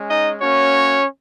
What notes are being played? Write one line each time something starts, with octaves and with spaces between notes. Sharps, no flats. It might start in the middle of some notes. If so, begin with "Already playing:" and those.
Already playing: G#3 C#4
D#4 D#5
A#3 C#4 F#4 C#5